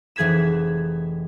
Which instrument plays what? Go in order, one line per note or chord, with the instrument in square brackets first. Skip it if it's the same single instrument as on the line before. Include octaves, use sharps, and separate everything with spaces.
[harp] F1 E3 G#4 G#6 B6 E7